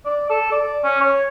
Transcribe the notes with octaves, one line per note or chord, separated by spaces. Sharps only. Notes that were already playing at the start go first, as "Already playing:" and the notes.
D5
A4
D5
C#4
C#5